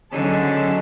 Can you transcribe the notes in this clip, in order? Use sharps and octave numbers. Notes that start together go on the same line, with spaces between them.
D3 F#3 C#4 D#4 G#4 A5